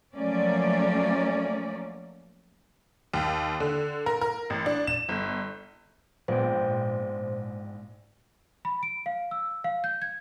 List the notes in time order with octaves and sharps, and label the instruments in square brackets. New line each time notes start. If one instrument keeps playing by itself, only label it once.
[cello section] F3 F#3 A3 A#3 C#4 D5
[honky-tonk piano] D#2
D3
A#4
A#4
A1
D4
E7
G1
[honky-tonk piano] A#1 B3 [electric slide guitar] G#2 G5 [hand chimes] C5
[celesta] B5
D7
F5
E6
F5
G6
G#6